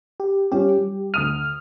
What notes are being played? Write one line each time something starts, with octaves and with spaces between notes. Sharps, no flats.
G4
G3 C#4 F4 G4
G3
D2 D#6 F6 D#7